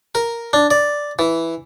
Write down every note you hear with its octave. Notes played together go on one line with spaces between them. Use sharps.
A#4
D4
D5
E3